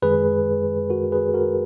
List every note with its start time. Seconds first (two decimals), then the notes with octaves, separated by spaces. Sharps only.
0.02 F#2 D#3 G#3 G#4 B4
0.90 F#4 A#4
1.12 G#4 B4
1.34 F#4 A#4